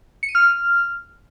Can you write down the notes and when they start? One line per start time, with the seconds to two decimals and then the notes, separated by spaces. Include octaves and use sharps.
0.23 C#7
0.29 D#7
0.35 F6